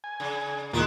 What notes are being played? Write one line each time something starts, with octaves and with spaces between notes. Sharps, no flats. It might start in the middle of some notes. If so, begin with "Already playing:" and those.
G#5
C#3
D#2 A#2 G#3 E4 F4